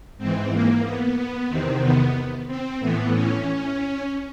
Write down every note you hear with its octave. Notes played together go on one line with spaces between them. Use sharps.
G#2 E3 C4
A#3
B3
B3
E2 C3 D#3 C4
B3
C4
A2 E3 B3
C#4